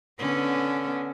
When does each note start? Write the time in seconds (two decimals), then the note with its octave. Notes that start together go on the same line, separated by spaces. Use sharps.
0.19 D3 B3 C#4